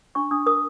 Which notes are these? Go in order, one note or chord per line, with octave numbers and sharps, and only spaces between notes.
D4 C#6
D4 D#6
A#4 D#6